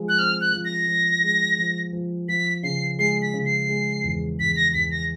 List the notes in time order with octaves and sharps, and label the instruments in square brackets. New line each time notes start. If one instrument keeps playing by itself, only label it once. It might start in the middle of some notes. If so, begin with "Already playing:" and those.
Already playing: [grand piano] F3 G#3
[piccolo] F#6
[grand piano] C4 [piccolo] F6
[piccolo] F#6
[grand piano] F3
[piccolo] A#6
[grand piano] F3
G#3
F3
F3
[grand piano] F3 [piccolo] B6
[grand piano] C#3 [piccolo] C7
[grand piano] G#3 [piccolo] C7
[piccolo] B6
[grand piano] C#3
[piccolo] C7
[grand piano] G#3
E2
[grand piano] E2 [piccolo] B6
[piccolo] A#6
[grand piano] E2 [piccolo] B6
[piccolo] A#6